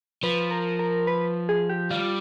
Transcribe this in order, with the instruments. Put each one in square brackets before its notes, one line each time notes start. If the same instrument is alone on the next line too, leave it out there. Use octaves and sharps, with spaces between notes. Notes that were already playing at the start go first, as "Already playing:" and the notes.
[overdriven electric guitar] F3 [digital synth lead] B4
[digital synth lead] A#4
A#4
B4
G#4
G4
[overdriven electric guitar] G3 [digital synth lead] F4